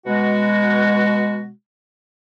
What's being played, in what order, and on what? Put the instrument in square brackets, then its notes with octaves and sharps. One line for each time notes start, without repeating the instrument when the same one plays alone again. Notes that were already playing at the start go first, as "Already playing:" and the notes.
[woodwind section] B2 G#3 F#4